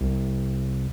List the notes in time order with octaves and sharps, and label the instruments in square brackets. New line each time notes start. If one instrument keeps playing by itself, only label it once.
[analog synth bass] C2